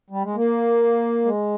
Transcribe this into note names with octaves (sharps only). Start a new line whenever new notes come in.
G3
G#3
A#3
G#3